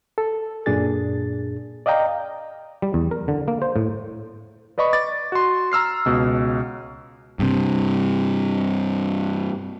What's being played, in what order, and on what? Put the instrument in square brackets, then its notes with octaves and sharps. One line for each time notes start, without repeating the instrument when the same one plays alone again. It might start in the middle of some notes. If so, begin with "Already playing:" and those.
[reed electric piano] A4
F#2 A#2 D4 G#4 A6
D5 D#5 F5 G5 A#5
[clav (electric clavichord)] G3
E2
A#4
D3
A#3
C5
A2
[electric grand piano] B4 D5 D#5 B5 C#6
D6 A6
F#4 C6
A#5 E6 F6 C7
C#2 B2
[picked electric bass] G2 C3